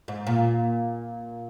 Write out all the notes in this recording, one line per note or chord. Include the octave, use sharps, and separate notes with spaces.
G#2
A#2